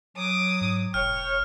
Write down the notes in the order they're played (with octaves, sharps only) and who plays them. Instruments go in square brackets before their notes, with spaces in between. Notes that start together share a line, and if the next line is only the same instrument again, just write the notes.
[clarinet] F#3 [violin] D6 D#6
[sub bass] G#2
[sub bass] E1 [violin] C#5 [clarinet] G5 [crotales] F6